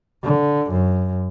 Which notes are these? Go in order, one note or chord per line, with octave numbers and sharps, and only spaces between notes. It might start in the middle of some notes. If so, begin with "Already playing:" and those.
D3
F#2